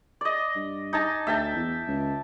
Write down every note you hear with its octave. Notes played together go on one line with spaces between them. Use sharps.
D5 D#5
G2
D#4 G#5 A5
D2 E5 G5 A5
E2
C#2